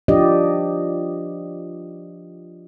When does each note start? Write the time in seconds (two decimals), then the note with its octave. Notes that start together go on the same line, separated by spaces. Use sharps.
0.08 F3 D4 F4 G4 D5 D#5